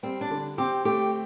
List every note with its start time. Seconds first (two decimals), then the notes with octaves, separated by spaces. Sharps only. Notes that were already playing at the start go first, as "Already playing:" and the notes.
0.03 G3 C4
0.21 D4
0.30 D3
0.58 C4 G4
0.85 A3 G4